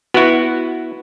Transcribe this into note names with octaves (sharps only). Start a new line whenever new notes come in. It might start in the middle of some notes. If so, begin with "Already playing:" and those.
B3 E4 F#4